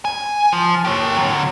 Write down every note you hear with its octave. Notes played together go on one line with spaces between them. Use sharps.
G#5
F3
G4 C#5
D3 F#3